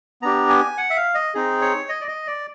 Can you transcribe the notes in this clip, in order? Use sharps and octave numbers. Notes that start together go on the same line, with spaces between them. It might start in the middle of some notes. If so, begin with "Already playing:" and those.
B3 D4 G4 A#5
G#5
F#5
E5
F5
D#5
C4 D#4 G#4
C#5
D#5
D5
D#5
D5